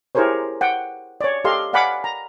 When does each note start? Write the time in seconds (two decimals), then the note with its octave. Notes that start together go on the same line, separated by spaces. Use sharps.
0.15 E4 G4 G#4 A#4 C5 C#5
0.61 F#5 G5
1.21 C#5 D5
1.45 G4 A4 D#5 F5 C6
1.73 D5 F5 F#5 G#5 B5 D6
2.04 A#5